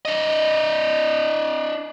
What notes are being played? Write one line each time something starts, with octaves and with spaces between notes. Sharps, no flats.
D4 D#5